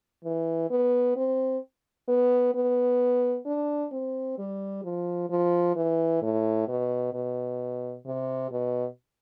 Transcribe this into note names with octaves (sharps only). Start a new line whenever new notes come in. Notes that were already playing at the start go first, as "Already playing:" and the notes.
E3
B3
C4
B3
B3
D4
C4
G3
F3
F3
E3
A2
B2
B2
C3
B2